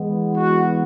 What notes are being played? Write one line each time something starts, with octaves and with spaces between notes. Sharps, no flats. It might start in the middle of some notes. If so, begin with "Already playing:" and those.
Already playing: E3 G#3 B3
F#4